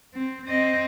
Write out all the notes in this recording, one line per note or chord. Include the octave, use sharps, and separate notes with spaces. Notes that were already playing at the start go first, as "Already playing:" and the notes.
C4
C4 D#5